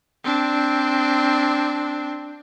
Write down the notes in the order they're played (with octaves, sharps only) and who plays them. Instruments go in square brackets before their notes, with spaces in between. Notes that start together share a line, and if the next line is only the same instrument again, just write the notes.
[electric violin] C4 D4